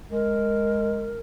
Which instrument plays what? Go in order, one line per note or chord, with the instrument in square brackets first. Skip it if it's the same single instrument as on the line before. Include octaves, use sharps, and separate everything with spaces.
[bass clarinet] G#3 [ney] A#4